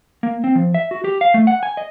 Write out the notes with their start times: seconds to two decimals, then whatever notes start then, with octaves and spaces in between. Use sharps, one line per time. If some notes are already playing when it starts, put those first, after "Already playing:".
0.23 A#3
0.44 C4
0.55 F3
0.74 E5
0.91 F#4
1.04 G4
1.21 F5
1.34 A3
1.47 F#5
1.63 G#5
1.77 D#5